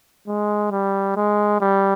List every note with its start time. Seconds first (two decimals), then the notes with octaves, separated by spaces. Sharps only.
0.28 G#3
0.71 G3
1.16 G#3
1.61 G3